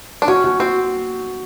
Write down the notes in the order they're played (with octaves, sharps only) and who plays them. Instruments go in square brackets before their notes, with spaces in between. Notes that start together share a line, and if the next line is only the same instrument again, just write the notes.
[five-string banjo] D4
[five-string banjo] C#4 [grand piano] F#4
[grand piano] F#4
[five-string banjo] C4 [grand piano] F#4